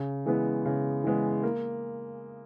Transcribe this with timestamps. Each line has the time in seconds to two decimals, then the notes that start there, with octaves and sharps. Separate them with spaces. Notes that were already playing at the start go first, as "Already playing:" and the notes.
Already playing: C#3
0.26 E3 G#3 B3
0.65 C#3
1.04 E3 G#3 B3
1.43 A#3